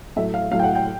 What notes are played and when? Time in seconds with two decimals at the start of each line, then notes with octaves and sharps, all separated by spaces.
0.16 A2 F#3 A3 E5
0.34 F5
0.51 A2 F#3 A3 F5
0.59 G5
0.64 F#5
0.75 G5